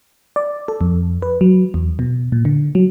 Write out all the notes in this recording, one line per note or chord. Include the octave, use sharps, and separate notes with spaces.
D5
A4
F2
B4
F#3
E2
B2
A#2
D3
F#3